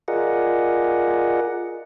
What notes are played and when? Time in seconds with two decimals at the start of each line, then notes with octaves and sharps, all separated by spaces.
0.08 F4 G#4 A#4 D5 D#5 F#5